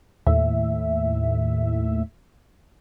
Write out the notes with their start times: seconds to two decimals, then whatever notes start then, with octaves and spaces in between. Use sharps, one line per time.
0.26 D#2 A2 E5